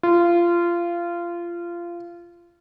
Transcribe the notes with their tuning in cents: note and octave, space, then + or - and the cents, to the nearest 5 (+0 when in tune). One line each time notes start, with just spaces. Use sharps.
F4 -20